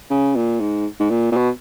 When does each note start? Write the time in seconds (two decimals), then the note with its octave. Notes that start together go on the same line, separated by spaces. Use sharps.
0.10 C#3
0.35 A#2
0.60 G#2
1.00 G#2
1.10 A#2
1.32 A#2
1.36 B2